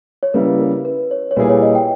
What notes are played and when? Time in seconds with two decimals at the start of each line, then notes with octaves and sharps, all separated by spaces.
0.23 C#5
0.34 C#3 G3 A#3 E4 B4
0.60 A#4
0.85 B4
1.11 C#5
1.31 C#5
1.36 A#2 G3 A#3 E4 G#4 B4
1.49 C#5
1.62 D#5
1.75 G5